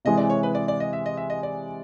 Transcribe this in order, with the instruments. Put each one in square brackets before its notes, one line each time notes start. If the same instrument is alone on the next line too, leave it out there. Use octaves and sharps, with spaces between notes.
[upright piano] C3 E3 G#3 [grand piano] D#5
[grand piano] D5
C#5
B4
D5
D5
D#5
E5
D#5
E5
D#5
D5